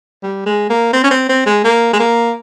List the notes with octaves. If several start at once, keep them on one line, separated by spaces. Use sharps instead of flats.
G3
G#3
A#3
C4
C#4
C4
C4
G#3
A#3
G#3
A#3